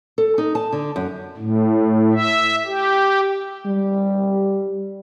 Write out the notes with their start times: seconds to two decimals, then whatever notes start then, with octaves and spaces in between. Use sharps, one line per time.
0.18 A4
0.38 D#4
0.55 A5
0.73 D3
0.96 F#2
1.37 A2
2.14 E5
2.67 G4
3.65 G3